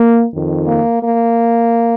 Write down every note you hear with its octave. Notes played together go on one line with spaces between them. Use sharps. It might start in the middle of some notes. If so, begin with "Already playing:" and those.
Already playing: A#3
F2 D#3
A#3
A#3